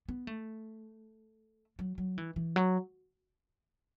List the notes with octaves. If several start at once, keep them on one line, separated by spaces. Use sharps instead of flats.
B3
A3
F#3
F#3
E3
E3
F#3